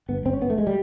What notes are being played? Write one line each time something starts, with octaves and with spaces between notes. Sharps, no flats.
G1 B3
G1 C4
C#4
G1 B3
A3
G#3
G3